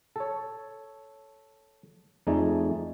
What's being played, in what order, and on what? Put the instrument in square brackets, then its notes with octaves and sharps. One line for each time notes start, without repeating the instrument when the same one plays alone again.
[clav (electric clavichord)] A4 C#5
F2 A3 D#4 G#4 D5